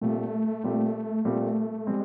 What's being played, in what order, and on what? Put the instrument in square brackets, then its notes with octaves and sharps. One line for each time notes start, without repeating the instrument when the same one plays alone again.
[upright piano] A#2 G3 C4 [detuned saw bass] A3
[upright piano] A#2 G3 C4
[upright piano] A#2 G3 C4 [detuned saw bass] A3
[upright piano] G3 C4 [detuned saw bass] G#3